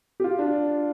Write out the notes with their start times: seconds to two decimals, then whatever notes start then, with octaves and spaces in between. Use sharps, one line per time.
0.20 G4
0.24 F4
0.39 D4